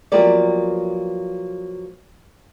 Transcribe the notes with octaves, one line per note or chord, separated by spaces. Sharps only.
F3 F#3 A#3 B3 G4 D5